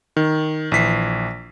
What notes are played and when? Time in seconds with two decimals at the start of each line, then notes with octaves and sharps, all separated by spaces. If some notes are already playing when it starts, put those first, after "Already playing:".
0.17 D#3
0.72 A#1 E3 B6 C7